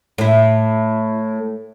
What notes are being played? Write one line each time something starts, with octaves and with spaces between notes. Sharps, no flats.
A2 E4